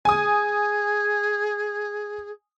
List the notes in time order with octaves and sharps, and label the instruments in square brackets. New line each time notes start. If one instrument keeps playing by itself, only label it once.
[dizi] G#4 [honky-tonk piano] G#5 D#6